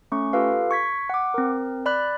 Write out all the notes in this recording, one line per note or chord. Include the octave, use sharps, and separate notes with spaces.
A3 C#4 C#6
F4 G4 A4 B4 F5
C#6 G#6 B6
F#5 D6
C4 A#4
D5 B5 F#6